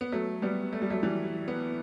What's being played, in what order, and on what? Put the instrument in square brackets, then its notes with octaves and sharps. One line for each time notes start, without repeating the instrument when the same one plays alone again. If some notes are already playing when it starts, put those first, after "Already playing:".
[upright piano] B3
F#3 A3
G3 B3
A3
G3
F#3 A3
E3 G3
B3